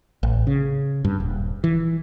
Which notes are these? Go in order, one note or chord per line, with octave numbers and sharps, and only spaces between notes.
A1
C#3
G2
D#1
E3